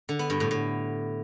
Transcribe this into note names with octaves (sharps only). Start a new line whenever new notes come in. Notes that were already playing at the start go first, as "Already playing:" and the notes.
D3
B3
G2
A2
A2